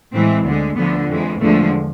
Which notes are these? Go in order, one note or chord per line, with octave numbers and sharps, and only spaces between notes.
A2 E3 G#3 C4
D2 D3 G#3
D2 D3 F3 B3
F2 E3 G#3
E2 D3 F3 G#3 A3